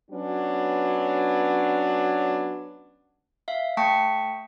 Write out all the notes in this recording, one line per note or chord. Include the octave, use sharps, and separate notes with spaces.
F#3 B3 C#4 D4
E5 F5
A3 G5 A5 C#6 B6 C#7